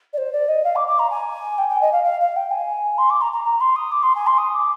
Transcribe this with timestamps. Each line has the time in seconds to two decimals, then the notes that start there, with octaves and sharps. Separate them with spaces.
0.13 D5
0.18 C5
0.33 D5
0.48 D#5
0.64 F5
0.76 D6
0.88 D6
0.99 A#5
1.10 G#5
1.58 G5
1.69 G5
1.81 D#5
1.92 F5
2.04 F5
2.20 F5
2.36 G5
2.51 G#5
2.98 C6
3.10 D6
3.21 A#5
3.32 A#5
3.44 A#5
3.61 C6
3.76 D#6
3.92 D6
4.03 C6
4.15 G#5
4.27 C6
4.38 D#6
4.54 D6